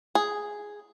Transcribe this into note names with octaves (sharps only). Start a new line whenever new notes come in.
G#4